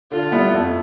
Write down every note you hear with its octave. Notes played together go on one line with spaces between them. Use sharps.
D3 F4
G3 B3 E4
F2